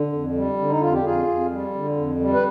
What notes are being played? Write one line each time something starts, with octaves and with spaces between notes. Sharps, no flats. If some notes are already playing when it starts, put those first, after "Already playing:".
Already playing: D3
F2
G3
D3
D#4
F2 F4
G4
F2 F4 G#4
F2
G3
D3
F2
G3
B4